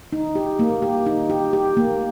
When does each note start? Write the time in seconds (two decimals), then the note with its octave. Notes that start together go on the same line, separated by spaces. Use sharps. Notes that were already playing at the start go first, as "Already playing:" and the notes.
0.13 D#4
0.35 G4
0.59 A#3
0.82 G4
1.06 D#4
1.30 G4
1.53 G4
1.77 A#3